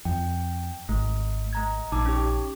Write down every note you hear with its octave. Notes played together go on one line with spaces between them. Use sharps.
F2 G5
G#1 A3
A3 A#5 G#6
A#1 D#4 A5 D6
C#4 G4